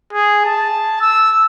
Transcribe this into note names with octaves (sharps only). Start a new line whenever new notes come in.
G#4
A5
E6